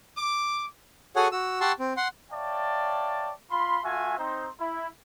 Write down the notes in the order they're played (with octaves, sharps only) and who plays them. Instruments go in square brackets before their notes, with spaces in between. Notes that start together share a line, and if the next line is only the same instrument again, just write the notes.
[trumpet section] D6
[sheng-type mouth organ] F#4 G#4 A4 C#5 F#5 G#5
F#4 E6
G4 F#5 A5 C6 C#6 E6
C4
F#5 C6
[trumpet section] C#5 D5 E5 F5 G5 A5
F4 B5 C6
A3 F4 F#4 E5 G#5
C4 D#4 C5
E4